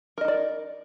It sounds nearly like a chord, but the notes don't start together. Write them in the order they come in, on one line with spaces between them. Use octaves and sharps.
A#4 D#5 D#4 D5